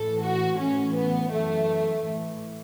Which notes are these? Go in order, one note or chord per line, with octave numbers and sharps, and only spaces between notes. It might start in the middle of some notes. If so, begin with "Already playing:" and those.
Already playing: A2 E3 A4
F#4
A2 E3 C#4
B3
F#2 E3 A3
A2 E3